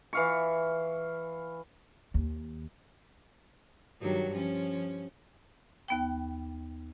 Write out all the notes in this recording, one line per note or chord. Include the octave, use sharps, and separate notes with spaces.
E3 F5 C#6
D#2
G2 D#3 F#3
F3 C#4
D#2 B3 G5